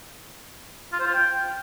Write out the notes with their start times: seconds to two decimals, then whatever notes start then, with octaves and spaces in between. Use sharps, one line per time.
0.92 F4
1.00 C5
1.07 F4
1.14 G5